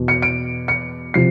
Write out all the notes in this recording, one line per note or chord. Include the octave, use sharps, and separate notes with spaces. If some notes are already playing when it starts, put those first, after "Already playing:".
Already playing: E2 B2 B3
C#7
D7
C#7
C3 F3 C7